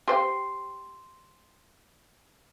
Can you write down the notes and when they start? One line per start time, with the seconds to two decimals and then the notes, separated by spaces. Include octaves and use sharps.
0.08 G4 C5 G5 C6